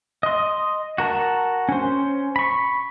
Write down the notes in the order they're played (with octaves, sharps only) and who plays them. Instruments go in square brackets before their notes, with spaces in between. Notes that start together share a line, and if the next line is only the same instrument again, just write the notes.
[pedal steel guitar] D#5 C6
F#4 A#4 A5
C#4 C5
B5 C#6